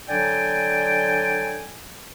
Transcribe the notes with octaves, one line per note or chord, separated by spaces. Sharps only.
D3 F#3 D5 G5 G#5